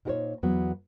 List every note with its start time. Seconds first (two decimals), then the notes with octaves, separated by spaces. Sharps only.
0.05 A#2 D#4 G4 A#4 C5 C#5
0.43 E2 F#3 B3